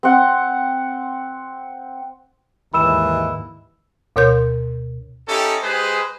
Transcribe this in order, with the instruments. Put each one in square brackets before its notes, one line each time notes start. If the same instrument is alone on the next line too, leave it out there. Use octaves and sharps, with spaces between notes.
[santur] C4 F#5
[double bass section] D#2 G#2 [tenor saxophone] E3 [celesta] B5 E6 E7
[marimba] D2 B2 A#4 C#5 C6 G6
[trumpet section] C#4 D#4 E4 G4 A4
G#3 G4 G#4 B4 C5